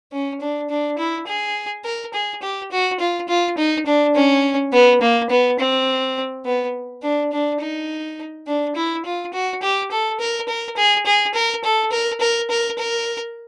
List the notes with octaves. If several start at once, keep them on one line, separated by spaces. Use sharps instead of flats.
C#4
D4
D4
E4
G#4
A#4
G#4
G4
F#4
F4
F4
D#4
D4
C#4
B3
A#3
B3
C4
B3
D4
D4
D#4
D4
E4
F4
F#4
G4
A4
A#4
A#4
G#4
G#4
A#4
A4
A#4
A#4
A#4
A#4